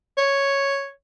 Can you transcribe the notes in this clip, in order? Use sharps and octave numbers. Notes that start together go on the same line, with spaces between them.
C#5